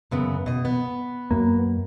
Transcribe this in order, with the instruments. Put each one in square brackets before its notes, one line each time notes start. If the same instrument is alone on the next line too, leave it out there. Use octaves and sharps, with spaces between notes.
[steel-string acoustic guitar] F#2 C#3 B3
B2 D#5
B3
[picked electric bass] F#2 A#3